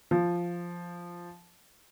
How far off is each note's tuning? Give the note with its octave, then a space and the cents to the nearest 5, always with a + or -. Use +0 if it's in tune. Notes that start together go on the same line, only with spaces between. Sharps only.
F3 -5